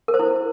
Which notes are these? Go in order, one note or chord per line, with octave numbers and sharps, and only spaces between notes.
A#4
C5
E4